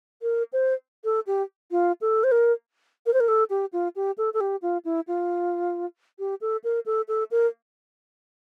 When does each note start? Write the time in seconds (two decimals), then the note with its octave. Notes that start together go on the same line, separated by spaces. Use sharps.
0.22 A#4
0.53 C5
1.04 A4
1.27 G4
1.71 F4
2.01 A4
2.24 C5
2.32 A#4
3.06 A#4
3.13 C5
3.20 A#4
3.28 A4
3.50 G4
3.73 F4
3.96 G4
4.18 A4
4.34 A4
4.40 G4
4.62 F4
4.85 E4
5.07 F4
6.19 G4
6.41 A4
6.64 A#4
6.86 A4
7.08 A4
7.31 A#4